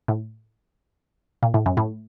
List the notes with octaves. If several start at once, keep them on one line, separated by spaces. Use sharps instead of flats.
A2
A#2
A2
F#2
A2